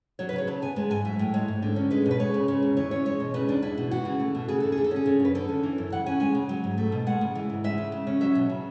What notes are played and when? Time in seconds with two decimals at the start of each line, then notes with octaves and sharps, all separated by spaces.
0.19 F#3 C#5
0.29 B4
0.33 C#3
0.38 C#5
0.47 C#3 A5
0.62 B3 G#5
0.76 G#3 A5
0.90 G#2 G#5
1.05 F#3 E5
1.19 A2
1.34 G#3 C#5
1.48 G#2
1.62 D3
1.76 C#4
1.91 G#3 B4
2.06 B2
2.11 B4
2.19 G#3 C#5
2.34 C#3
2.48 C#3
2.62 E2
2.77 E3 C#5
2.91 C#4 C#5
3.05 G#3 C#5
3.20 B2
3.34 C#3 B4
3.48 E2 D4
3.62 G#3 E4
3.78 B2
3.91 E3 F#4
4.05 C#3
4.20 A3
4.35 B2
4.48 C#3 G#4
4.60 E2 A4
4.72 G#4
4.77 D3
4.84 A4
4.91 C#4 G#4
5.06 C#3
5.20 F#2 B4
5.35 D3 A4
5.49 C#4
5.63 E3
5.78 F#2
5.92 C#3 F#5
6.06 C#4 G#5
6.20 G#3 G#5
6.35 C#3
6.49 F#3
6.64 G#2
6.78 A3
6.92 B2
7.06 G#3 F#5
7.21 C#3
7.35 E3
7.50 G#2
7.64 G#3 E5
7.78 C#3
7.92 C#3
8.07 C#4
8.21 F#3 E5
8.35 B2
8.50 C#3